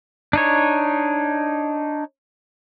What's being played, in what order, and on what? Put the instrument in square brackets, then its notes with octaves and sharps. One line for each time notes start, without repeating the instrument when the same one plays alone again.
[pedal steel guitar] D4 D#4 C#5